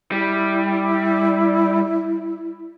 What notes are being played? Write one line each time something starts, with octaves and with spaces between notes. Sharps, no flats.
G3 E4